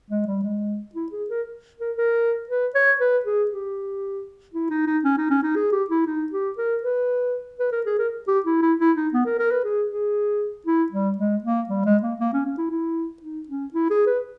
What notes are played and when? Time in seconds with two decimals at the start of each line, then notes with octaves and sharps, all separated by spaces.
0.11 G#3
0.27 G3
0.44 G#3
0.95 E4
1.12 G#4
1.30 A#4
1.80 A#4
1.98 A#4
2.49 B4
2.75 C#5
3.01 B4
3.26 G#4
3.51 G4
4.54 E4
4.70 D#4
4.87 D#4
5.05 C#4
5.18 D#4
5.31 C#4
5.43 D#4
5.56 G#4
5.73 G4
5.90 E4
6.07 D#4
6.32 G4
6.58 A#4
6.83 B4
7.60 B4
7.72 A#4
7.86 G#4
7.99 A#4
8.28 G4
8.46 E4
8.62 E4
8.80 E4
8.97 D#4
9.14 B3
9.26 A#4
9.39 A#4
9.51 B4
9.65 G#4
9.90 G#4
10.67 E4
10.92 G3
11.18 G#3
11.44 A#3
11.70 G3
11.86 G#3
12.03 A#3
12.20 A#3
12.34 C#4
12.46 C#4
12.58 E4
12.71 E4
13.22 D#4
13.48 C#4
13.74 E4
13.90 G#4
14.07 B4